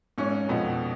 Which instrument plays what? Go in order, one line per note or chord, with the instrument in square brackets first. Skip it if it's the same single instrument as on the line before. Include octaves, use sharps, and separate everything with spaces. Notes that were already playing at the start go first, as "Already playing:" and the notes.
[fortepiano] G#1 G#2 [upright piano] C#4
[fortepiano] F2 [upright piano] B2